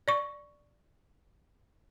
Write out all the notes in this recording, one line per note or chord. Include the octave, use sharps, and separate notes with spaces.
D5 C#6